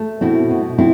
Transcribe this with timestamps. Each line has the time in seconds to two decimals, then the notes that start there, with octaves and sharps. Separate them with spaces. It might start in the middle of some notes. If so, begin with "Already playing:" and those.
Already playing: A3
0.21 B2 C4 E4
0.50 B2
0.78 C4 E4